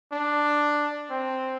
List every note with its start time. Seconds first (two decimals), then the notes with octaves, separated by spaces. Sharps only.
0.12 D4
1.10 C4